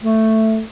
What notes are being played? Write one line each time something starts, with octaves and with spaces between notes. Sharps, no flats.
A3